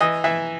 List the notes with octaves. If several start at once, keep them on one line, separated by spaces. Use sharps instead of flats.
E3 D#5
E3 E5